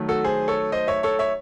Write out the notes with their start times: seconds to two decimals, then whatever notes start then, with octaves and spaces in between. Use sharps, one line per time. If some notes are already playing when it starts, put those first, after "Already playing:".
Already playing: D#3 F#3 A3
0.08 F#4 A4
0.24 G#4 C5
0.48 A4 C#5
0.72 C5 D#5
0.88 C#5 E5
1.03 A4 C#5
1.19 C#5 E5